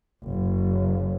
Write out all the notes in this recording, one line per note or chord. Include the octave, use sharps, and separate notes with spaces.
F#1